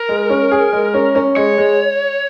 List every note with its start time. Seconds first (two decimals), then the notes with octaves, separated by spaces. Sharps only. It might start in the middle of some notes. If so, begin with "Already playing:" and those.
Already playing: A#4
0.09 G#3
0.30 C#4
0.51 G#4
0.73 G#3
0.94 C#4
1.15 C#4
1.36 G#3 C#5
1.58 G#3